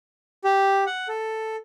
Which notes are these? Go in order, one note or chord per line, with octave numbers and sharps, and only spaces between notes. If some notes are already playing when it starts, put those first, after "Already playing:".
G4
F#5
A4